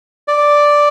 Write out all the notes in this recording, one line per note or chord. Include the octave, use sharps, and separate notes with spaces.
D5